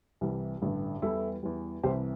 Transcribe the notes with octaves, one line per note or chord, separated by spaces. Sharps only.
C2 C3 E3 G3
A1 G2 D3 G3
E2 E3 G3 E4 A4
E2 E3 G3
C2 C3 E3 G3 G4 C5